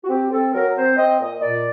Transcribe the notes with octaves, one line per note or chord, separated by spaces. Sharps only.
F#4
C4 G4
C4 A4
F#3 A#4
C4 C5
C4 D#5
A#2 D#5
A#2 D5